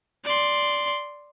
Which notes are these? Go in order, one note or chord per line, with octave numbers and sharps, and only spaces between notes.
D5 C6